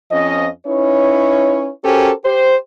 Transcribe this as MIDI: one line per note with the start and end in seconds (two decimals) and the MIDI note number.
0.11 0.47 41
0.11 0.47 53
0.11 0.47 61
0.11 0.47 75
0.67 1.71 61
0.67 1.71 63
0.67 1.71 64
0.67 1.71 71
0.67 1.71 73
1.84 2.11 61
1.84 2.11 66
1.84 2.11 67
1.84 2.11 69
1.84 2.11 70
1.84 2.11 72
2.25 2.56 67
2.25 2.56 72